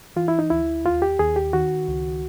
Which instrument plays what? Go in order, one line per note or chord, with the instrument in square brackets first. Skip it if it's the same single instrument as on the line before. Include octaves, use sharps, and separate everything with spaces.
[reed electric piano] E3 F4
E4
D#4
D2 E4
D#2 F4
G4
D#2 G#4
G4
D#3 F#4
C#2